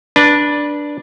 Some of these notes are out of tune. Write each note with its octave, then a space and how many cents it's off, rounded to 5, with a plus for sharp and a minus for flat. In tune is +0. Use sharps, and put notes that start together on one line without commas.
D4 +0 B4 -25